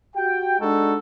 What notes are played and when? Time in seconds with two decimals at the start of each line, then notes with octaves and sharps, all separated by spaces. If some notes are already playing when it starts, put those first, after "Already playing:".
0.16 F#4 G4 G5
0.60 G#3 D4 D#4 F#4 A4